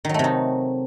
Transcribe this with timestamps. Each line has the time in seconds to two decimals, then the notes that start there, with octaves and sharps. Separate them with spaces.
0.05 D#3
0.09 F#3
0.14 A3
0.19 C3
0.24 D#4